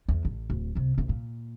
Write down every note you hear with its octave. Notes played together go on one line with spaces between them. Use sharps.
E2
A1
D1
C2 C3
D2 A2
A#2